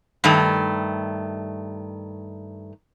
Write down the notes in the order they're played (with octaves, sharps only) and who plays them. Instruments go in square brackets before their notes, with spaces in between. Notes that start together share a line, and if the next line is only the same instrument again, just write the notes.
[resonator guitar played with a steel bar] G2 D#3 A3